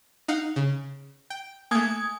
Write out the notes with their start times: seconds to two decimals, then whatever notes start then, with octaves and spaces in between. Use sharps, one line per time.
0.28 D#4 F5 F#5
0.56 C#3
1.30 G5
1.71 A3 A#3 G#5 D#6 G#6